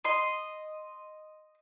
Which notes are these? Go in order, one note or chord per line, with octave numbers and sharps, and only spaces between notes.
D#5 C6